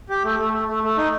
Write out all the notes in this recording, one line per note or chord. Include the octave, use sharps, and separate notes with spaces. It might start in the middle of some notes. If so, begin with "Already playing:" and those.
G4
A3
A3
A3
A3
A3
D#4